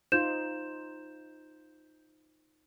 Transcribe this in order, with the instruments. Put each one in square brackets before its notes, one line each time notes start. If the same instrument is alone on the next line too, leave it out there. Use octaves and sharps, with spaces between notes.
[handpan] D#4 F4 C5 [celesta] G6 E7